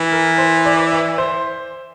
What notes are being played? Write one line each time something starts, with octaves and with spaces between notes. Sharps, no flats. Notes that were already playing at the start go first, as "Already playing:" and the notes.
Already playing: E3
A#4
C5
D5
E5
C5